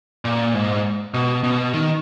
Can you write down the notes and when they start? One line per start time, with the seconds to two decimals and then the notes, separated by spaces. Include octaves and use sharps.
0.25 A#2
0.54 G#2
1.14 B2
1.43 B2
1.74 D#3